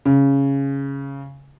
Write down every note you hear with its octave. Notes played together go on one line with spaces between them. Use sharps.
C#3